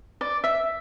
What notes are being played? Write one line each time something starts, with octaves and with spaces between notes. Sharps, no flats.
D5
E5